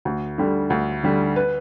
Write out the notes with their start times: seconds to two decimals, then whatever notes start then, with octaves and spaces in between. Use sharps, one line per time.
0.05 D2
0.38 D3 G3
0.70 D2
1.03 D3 G3
1.36 B4